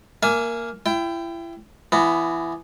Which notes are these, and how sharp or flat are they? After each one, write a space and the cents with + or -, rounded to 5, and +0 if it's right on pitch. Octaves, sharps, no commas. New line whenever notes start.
A#3 +0 E5 +40 G#5 +15
E4 +35 G5 +0
E3 +20 B3 +0 A#5 -30